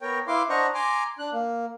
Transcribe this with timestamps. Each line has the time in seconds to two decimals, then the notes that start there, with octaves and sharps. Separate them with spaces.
0.01 B3 A#4 C#5 G5
0.27 E4 B4 F5 C6 D6
0.49 D4 C5 D#5 F#5 A#5 C#6
0.74 G#5 A#5 C6 D6
1.19 D4 F#6
1.33 A#3